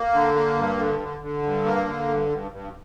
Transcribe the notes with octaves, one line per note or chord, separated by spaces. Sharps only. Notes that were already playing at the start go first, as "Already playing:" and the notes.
Already playing: A#3
D3
A#3
G2
D3
D3
D3
G2
A#3
D3
G2
G2
G2